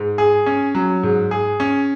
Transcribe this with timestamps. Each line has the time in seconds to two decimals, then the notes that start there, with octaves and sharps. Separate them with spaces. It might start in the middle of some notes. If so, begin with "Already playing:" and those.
Already playing: G#2
0.18 G#4
0.46 C#4
0.75 F#3
1.03 G#2
1.31 G#4
1.60 C#4